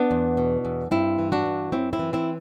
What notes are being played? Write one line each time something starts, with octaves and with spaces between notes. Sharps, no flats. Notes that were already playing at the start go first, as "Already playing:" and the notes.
Already playing: B3 D4
E2
B2
E2
G2 C4 E4
E3
D4 F#4
G2
F#2 C4 E4
C4 E4
E3
C4 E4